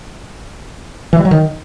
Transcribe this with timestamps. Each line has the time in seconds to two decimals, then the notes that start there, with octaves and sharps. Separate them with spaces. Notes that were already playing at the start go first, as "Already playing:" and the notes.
1.13 E3
1.19 G3
1.25 F#3
1.31 D#3